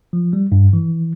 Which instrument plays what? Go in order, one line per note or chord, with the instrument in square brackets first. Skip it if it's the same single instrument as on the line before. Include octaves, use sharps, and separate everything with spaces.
[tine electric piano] F3
G3
G2
E3